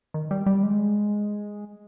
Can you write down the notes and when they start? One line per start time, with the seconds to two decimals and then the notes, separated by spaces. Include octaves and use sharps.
0.14 D#3
0.31 G3
0.46 G3
0.63 G#3